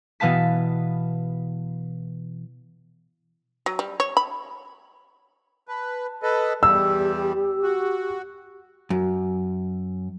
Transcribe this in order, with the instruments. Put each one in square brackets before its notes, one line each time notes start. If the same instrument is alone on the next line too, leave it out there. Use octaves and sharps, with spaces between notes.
[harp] B2 E3 B3 F5 A5 B6
[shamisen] F#3
G3
C#5
B5
[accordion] B4 [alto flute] A5
[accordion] A4 B4 D#5
[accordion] E2 G3 [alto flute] G4 [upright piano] E6
[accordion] F#4
[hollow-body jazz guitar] F#2